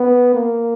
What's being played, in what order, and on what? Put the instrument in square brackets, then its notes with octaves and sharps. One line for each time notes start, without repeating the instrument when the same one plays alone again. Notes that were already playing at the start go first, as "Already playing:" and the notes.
Already playing: [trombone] B3
A#3